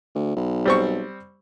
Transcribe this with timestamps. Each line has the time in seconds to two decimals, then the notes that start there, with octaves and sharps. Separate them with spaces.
0.15 D2
0.36 B1
0.65 G3 C4 C#6